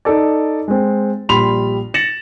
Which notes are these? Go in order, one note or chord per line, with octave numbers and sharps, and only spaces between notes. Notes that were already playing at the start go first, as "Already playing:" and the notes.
D#4 A4 D5
G#3 C4
A#1 G3 B5 C6 F7
A6 A#6 C#7 E7 F#7